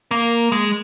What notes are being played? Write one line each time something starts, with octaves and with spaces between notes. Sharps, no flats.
A#3
G#3